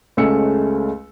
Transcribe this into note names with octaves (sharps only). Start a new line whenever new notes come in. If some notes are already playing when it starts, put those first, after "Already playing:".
C#2 G#3 A3 C#4 E6 C#7